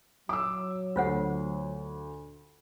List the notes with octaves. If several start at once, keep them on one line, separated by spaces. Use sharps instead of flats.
F#3 D6 E6
D2 F4 C5 F#5